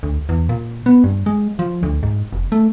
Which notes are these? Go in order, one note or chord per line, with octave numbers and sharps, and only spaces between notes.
D2
E2
A#2
B3
G2
G#3
F3
D2
G#2
F1
A3